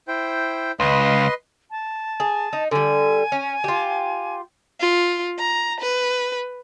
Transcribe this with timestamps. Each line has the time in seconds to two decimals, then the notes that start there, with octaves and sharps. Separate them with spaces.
0.08 E4 C5 G5
0.80 C#2 B4 D#5 C6
1.71 A5
2.20 G#4
2.53 D#4
2.71 D3 G3 G#5
3.32 C#4
3.64 F4 G4
4.80 F4
5.39 A#5
5.81 B4